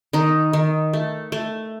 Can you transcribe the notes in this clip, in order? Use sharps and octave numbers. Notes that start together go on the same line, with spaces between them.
D#3 D#4
D#3
A3
A3